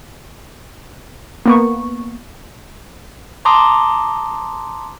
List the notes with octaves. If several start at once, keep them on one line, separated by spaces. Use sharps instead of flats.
A#3 B3 C#6
A5 A#5 C6 D6 D#6